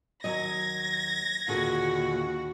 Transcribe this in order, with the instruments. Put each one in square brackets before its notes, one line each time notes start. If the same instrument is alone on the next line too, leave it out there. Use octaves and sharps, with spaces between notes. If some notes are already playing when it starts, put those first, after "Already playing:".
[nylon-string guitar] D#2 F#3 D#5 [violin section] G#6 A#6
[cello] D#2 F#4 [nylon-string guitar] A#2 D3 G#4